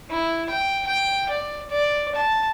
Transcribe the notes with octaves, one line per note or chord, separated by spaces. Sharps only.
E4
G5
G5
D5
D5
A5